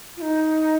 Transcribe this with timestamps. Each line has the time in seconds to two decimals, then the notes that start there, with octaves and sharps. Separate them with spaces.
0.17 F4
0.22 D#4